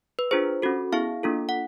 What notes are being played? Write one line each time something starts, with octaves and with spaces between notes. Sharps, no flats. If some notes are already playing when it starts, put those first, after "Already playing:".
B4
D4 F4 G#4 C5
C#4 F#4 A4
B3 E4 G#4 F5
A#3 D4 F4 A4
F#5